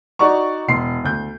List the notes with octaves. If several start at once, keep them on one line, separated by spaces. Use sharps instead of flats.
D#4 F#4 D5 A#5 C#6
E1 C6 C7
D2 G6